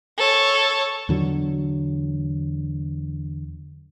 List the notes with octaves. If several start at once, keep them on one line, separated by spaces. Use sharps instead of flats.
A4 C#5
E2 D3 F#3